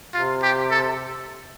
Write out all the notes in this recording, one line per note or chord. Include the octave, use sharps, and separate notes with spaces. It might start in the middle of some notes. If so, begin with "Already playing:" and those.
C3 F4
G4
A4